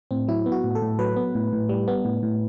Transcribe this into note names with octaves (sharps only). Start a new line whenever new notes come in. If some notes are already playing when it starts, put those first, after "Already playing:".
A2 C4
F#3 E4
B3
F#4
A2
A4
A2
F#3 B4
B3
A2
A2
G3
B3
A2
A2